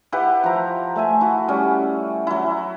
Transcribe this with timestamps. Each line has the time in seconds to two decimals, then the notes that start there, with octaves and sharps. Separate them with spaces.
0.12 E4 G4 B4 F#5
0.44 F3 A#5
0.96 A3 E5 G#5
1.21 E4 F#4
1.48 G3 C#4
2.27 F#3 E4